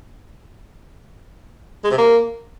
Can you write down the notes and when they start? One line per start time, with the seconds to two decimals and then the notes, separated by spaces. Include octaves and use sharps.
1.84 G#3
1.91 C3
1.98 A#3